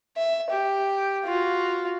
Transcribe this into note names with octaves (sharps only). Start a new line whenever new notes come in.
E5
G4
F4 F#4